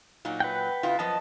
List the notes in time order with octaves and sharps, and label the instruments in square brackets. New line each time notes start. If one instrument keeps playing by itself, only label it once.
[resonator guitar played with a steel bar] A#2 F#3 D#4
[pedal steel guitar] B4 F#5 G5
[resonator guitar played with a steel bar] C#3 E4 F4
[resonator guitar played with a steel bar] F#2 F3 B3 [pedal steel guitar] D#5 A5